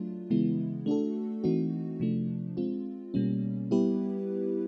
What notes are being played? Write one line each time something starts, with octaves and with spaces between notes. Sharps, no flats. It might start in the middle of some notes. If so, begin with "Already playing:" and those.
Already playing: F#3 A3 D4 F4
C#3 E3 G#3 B3 E4
A3 D4 F#4 A4
E3 A3 C4 D#4 F#4
C3 F3 A3 D4
G#3 C4 F4
B2 G3 A#3 C#4
G3 B3 E4 G4 B4